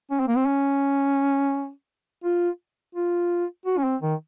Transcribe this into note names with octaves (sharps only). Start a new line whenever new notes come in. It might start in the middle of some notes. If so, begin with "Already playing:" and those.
C#4
C4
A#3
C4
C#4
F4
F4
F#4
C#4
C4
D#3